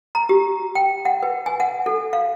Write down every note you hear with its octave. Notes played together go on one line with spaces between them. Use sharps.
A#5
G4
G5
F#5
B4
G#5
F#5
A4
F5